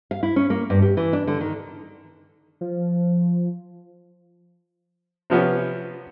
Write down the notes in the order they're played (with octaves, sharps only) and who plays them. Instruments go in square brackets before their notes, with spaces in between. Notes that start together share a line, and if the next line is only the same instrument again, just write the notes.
[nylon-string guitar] F5
E4
C#4
A#3
G2
G4
E3
D4
D3
D#3
[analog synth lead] F3
[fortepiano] C3 F3 B3 C#4